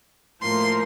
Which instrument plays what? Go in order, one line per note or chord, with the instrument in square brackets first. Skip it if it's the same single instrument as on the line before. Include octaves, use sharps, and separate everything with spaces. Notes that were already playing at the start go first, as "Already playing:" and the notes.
[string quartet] A2 F3 A#3 C6